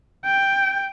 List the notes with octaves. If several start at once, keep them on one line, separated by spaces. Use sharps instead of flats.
G5